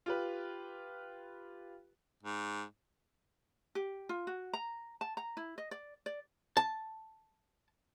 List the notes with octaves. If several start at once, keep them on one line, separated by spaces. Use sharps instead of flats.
F4 G4 B4
G#2
G4
F4
F#4
A#5
A5
A#5
E4
D#5
D5
D5
A5